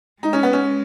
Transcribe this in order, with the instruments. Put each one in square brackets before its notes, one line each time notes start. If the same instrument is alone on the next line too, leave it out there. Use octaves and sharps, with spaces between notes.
[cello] G#3 [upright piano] D#4
[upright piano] C#4
B3
C#4